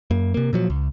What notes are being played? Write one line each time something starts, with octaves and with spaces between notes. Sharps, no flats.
F#2 A#3
C3 A#3
A#2 F3 F#3
C#2